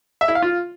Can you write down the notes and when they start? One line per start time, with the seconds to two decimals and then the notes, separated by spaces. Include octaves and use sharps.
0.21 E5
0.28 E4
0.35 F5
0.42 F4